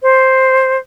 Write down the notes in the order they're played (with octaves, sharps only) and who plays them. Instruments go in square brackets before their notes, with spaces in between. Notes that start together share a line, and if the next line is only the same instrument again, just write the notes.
[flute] C5